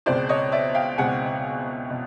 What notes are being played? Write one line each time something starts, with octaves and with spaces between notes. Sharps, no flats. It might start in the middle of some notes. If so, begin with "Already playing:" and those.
C#2 B2 G#3 C4 C5 D5
C#5 D#5
D5 E5
F5 G5
C#2 B2 G#3 C4 F#5 G#5
B2